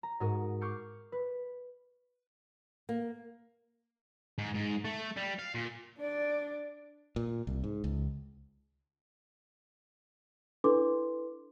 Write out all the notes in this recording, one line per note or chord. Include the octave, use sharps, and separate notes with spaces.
A#5
G#2 F#4 A#4 D#6
C#6 D6 F6 G6 C7 C#7
B4
A#3
G#2
G#2
A3
G3
F5
A#2
D4 D5
A#2
C2
G#2
C#2
D4 E4 A4 B4 C6 D6